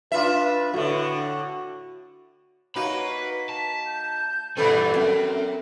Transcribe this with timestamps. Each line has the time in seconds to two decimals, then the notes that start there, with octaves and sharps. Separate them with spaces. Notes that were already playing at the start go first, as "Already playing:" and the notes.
0.12 D4 F4 B4 E5
0.74 A2 D3 F#4
2.75 A#3 D#4 F#4 B4 C#5 B5
3.11 B6
3.49 A5
3.86 G6
4.57 A#2 E3 G3 C4 A4 B4 A6
4.95 F#2 C4 A#4